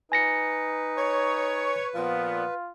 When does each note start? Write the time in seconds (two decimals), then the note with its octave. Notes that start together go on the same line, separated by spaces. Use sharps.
0.12 D#4 B4 G#5 A#6 C#7
0.98 C#5
1.95 A#2 F3 B3 F4